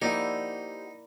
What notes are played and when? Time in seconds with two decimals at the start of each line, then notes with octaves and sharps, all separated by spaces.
0.02 A#3 D#4 E4 G4 C5 D5 F#5